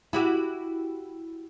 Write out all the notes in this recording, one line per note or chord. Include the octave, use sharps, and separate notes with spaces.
E4 F#4 G4